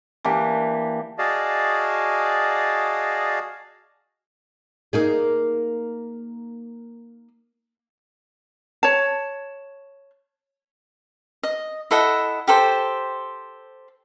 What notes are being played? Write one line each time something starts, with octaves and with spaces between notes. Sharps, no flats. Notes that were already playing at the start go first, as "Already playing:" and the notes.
E3 A#3 D4 G4
F#4 G#4 D5 D#5 F5 A5
A#3 D#4 G#4
C#5 A5
D#5
E4 A4 D#5 F#5
G4 A4 C5